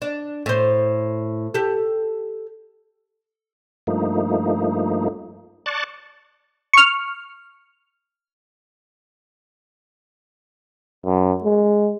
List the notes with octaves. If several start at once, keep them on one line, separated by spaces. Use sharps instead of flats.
D4
A2 C5
G4 A4
G2 F3 A3 A#3 D#4
D5 A5 C#6 F#6 A6
C#6 F6
F#2
G#3